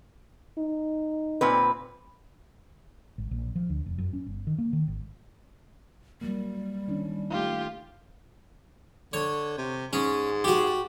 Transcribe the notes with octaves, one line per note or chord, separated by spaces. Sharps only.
D#4
A#2 C4 B4
G#1
A#1
F3
D2
F1
F#2
C#4
G1
D#3
A#3
D#3
G#1
F#3 G3 A#3
D#3 C#4 D4
A3 D#4 F4 G4
D3 C#5
C3
G#2 C#4
F#4 G4